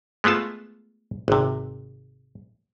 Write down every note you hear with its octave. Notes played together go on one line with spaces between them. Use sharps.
G#3 A3 B3 F4 A5
G#1 C3